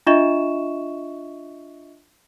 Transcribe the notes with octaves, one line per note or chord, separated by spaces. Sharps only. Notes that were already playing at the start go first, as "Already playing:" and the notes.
D4 F4 D#5 E5 C#6 E7